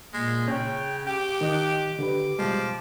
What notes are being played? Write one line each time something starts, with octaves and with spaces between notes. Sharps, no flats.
A#2 G#3
C#3 C#4 G5
G4 G5 D6
D#3 D#5 F#6
D3 G4 B4
B2 F3 G3 G#3